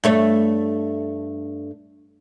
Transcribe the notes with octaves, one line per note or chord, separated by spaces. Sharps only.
G2 A3 C#5